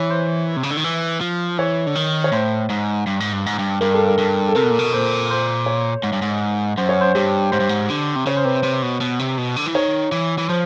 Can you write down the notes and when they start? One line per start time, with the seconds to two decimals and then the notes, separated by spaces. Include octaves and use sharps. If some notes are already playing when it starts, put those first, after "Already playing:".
Already playing: E3 C#5
0.10 C5
0.56 C3
0.63 C#3
0.71 D3
0.77 D#3
0.84 E3
1.21 F3
1.58 E3 C#5
1.87 D3
1.95 D#3
2.24 C#5
2.32 A2 C5
2.70 G#2
3.07 G2
3.20 G#2
3.33 G2
3.46 G#2
3.59 G2
3.81 G2 A#4
3.94 A4
4.08 A#4
4.18 G2
4.49 A4
4.55 C3 A#4
4.63 B2
4.71 A#2
4.79 B2
4.93 A#2 C5
5.30 C5
5.66 C#5
6.03 G#2
6.13 G2
6.22 G#2
6.77 F#2 C5
6.89 C#5
7.01 C5
7.15 G2 G4
7.52 G#2 C5
7.60 G2
7.69 G#2
7.90 D3
8.16 C3
8.26 C#3 C#5
8.37 C5
8.45 C3 B4
8.55 C5
8.63 C3
8.82 B2
9.01 B2
9.19 C3
9.38 B2
9.56 D3
9.66 E3
9.74 D#3 C#5
10.12 E3
10.38 E3
10.49 F3 C5